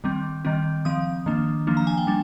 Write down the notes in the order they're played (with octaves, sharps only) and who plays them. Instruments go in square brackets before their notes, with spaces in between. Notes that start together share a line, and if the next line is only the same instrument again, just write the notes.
[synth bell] D#3 G3 C4
D#3 G3 C4
F3 C4 D#6
D#3 A#3 D4
F3 A#3 D4
A#5
G#5
G5
G3 D4